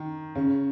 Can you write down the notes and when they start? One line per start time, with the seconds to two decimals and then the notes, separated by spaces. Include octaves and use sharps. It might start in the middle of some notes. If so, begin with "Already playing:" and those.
Already playing: D#3
0.35 C#3